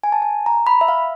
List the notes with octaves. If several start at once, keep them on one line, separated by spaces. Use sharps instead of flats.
G#5
A5
G#5
A#5
B5
E5
F5